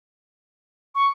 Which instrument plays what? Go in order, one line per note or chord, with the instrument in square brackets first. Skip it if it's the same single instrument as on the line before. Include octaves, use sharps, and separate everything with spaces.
[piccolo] C#6